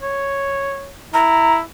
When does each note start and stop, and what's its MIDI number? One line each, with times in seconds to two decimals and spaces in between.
0.02 0.91 73
1.14 1.61 64
1.14 1.54 82